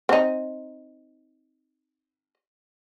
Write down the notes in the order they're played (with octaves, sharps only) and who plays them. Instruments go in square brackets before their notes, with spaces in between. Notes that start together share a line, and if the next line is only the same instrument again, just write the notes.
[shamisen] C4 D#4